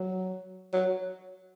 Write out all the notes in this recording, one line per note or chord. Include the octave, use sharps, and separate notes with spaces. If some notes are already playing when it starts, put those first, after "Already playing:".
Already playing: F#3
F#3